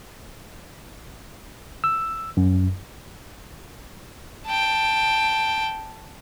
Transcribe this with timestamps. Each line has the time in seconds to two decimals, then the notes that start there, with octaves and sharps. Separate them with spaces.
1.84 E6
2.37 F#2
4.46 G5 A5